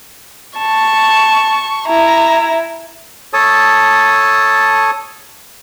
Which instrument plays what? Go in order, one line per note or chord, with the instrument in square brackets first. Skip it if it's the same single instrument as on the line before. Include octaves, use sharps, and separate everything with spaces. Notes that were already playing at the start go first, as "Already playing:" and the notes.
[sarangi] A5 [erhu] C#6
[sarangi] E4 [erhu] A#5
[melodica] A4 C#5 A5 D#6